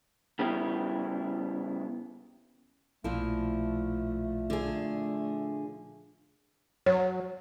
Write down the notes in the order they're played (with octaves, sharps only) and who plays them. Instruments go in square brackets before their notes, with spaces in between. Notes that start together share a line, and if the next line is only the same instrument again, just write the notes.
[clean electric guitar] C#3 G3 B3 E4 G4
[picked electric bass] B1 B3 [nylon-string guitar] A#2 F3 E4 [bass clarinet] A3
[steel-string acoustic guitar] D3 G#4
[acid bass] F#3 [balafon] C#5